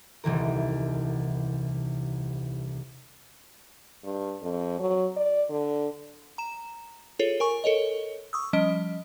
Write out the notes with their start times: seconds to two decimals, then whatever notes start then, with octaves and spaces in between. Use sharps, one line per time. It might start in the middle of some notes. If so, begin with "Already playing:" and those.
0.24 D#1 C2 E3 A#4
4.04 G2
4.42 F2
4.79 F#3
5.17 D5
5.50 D3
6.38 A#5 E7
7.19 F4 G#4 A4 C#5
7.40 A#4 G#5 C#6
7.64 A4 A#4 C#5 D#5
8.33 C#6 D#6 E6
8.53 F3 G3 C#4 D#5 D7